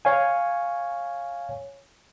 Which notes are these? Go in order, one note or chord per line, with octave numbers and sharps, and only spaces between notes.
C#5 F5 G#5